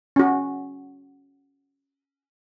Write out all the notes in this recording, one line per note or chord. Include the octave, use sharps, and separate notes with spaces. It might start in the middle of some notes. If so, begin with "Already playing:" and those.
C#4 F#4